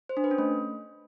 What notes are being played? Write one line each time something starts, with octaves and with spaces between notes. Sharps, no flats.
C5
D4
B4
C#4
A3